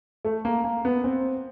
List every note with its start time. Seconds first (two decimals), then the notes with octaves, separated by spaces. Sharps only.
0.25 A3
0.45 A#3
0.64 A#3
0.85 B3
1.04 C4